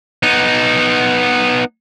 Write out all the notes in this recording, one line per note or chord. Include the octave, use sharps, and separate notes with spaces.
B3 D#4